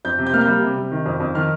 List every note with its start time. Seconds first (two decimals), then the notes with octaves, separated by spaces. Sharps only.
0.05 F2 G6
0.19 C3
0.27 G6
0.34 A#3 F6
0.41 G6
0.48 G3
0.62 C3
0.77 C3
0.92 D#3
1.06 F2
1.20 F2
1.35 D#3 F6